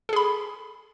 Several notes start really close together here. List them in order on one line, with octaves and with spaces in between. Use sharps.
A4 G#4 B5